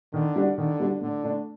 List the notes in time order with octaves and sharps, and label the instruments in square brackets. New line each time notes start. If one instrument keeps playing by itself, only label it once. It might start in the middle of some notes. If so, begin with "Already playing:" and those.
[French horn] D3 [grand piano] D#3
[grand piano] G3 D4 F#4
[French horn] D3 [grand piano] D#3
[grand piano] G3 D4 F#4
[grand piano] A2 [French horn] D3
[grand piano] A3 D4